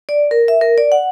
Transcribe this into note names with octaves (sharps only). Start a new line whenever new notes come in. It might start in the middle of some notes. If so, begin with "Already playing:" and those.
D5
A#4
E5
A#4
D5
F#5